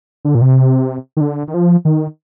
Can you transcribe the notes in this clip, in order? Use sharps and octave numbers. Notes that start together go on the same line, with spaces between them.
D3
A#2
C3
D#3
D3
D#3
F3
D#3